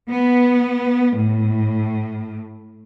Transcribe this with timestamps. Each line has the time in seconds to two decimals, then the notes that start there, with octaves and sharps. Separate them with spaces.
0.11 B3
1.17 A2